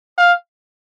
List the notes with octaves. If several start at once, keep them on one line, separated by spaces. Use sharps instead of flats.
F5